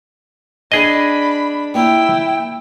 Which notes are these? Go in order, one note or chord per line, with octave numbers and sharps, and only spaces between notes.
D4 G#4 A4 D#5 G5 G#5 B5
A#2 A#3 C#4 E4 G5 E6